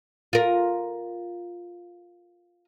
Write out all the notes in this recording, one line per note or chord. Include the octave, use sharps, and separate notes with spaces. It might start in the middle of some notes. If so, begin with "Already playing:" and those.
F4 A#4